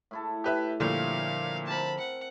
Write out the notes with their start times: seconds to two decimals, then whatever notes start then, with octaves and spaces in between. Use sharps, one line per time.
0.11 A2 E4 A4
0.44 G4 B4 E5
0.80 A#2 D3 F3 G3 A3 F5
1.67 C4 A#4 A5 B5
1.98 F#5